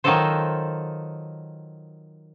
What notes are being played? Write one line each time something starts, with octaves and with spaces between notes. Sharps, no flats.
D#3 F#3 D#4 F4 A4 C5